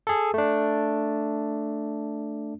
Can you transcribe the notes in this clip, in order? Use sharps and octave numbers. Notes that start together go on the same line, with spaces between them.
G#4 A4
A3 D4